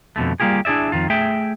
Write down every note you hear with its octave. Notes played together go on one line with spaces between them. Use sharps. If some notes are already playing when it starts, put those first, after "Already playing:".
F2 B2 D3 A3
G3 A#3 F4 G4 G#4
D4 E4 G#4 D5 E5
F2 A#2 D#3 F4
A3 G#4 E5 G5